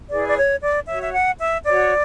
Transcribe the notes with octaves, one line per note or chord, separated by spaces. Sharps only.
E4 G#4 B4 D5
D5
C#5
D5
F#4 C#5 E5
E5
F#5
E5
F#4 C#5 D5